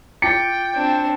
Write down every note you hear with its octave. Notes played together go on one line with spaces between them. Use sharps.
F4 G5 D6 A6 C#7
C4 D4